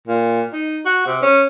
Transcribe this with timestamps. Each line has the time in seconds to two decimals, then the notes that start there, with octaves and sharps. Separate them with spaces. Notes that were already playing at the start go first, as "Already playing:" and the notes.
0.08 A#2
0.53 D#4
0.86 F#4
1.07 C3
1.22 C#4